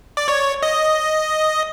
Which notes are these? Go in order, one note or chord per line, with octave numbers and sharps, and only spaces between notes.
D5
C#5
D#5